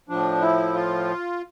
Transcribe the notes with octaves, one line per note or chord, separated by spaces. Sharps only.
A2 F3 D4
E4
F4